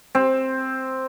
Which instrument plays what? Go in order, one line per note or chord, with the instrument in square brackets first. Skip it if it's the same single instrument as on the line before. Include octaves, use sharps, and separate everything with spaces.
[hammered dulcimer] C4